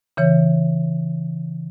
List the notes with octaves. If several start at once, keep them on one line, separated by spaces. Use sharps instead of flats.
C#3 E3 C#5